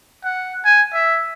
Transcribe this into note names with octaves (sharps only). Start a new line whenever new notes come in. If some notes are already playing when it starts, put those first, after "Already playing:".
F#5
G#5
E5